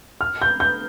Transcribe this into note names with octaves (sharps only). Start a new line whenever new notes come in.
F6
G6
G6